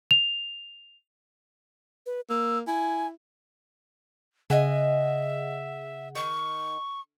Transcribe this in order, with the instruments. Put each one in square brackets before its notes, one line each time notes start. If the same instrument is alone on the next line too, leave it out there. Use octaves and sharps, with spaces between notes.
[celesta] F7
[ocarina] B4
[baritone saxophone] A#3 [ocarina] E6
[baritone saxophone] E4 [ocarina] G#5
[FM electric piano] C#3 G#4 F#5 [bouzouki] D#5 G#5 [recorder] E5
[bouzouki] D#3 [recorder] C#6